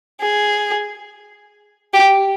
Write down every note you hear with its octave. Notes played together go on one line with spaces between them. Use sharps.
G#4
G4